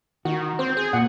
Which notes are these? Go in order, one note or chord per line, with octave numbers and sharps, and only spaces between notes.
D#3 F#4
C4 C5
G#4
A#2 F#5